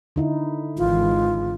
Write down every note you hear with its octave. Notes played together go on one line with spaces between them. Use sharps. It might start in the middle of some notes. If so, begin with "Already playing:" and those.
D3 D#4 E4
G#1 E3 G#3 F4